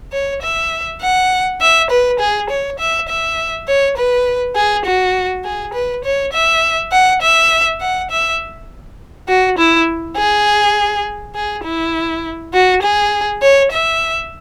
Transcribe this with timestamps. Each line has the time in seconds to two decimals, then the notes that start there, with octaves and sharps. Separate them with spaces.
0.12 C#5
0.42 E5
1.01 F#5
1.61 E5
1.90 B4
2.19 G#4
2.50 C#5
2.79 E5
3.09 E5
3.68 C#5
3.97 B4
4.56 G#4
4.85 F#4
5.44 G#4
5.74 B4
6.04 C#5
6.33 E5
6.92 F#5
7.22 E5
7.81 F#5
8.11 E5
9.28 F#4
9.58 E4
10.17 G#4
11.35 G#4
11.64 E4
12.53 F#4
12.82 G#4
13.42 C#5
13.72 E5